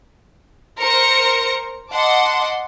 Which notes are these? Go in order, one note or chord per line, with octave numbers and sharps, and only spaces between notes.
A#4 C5 A#6 C#7
D#5 F#5 A5 C6 D6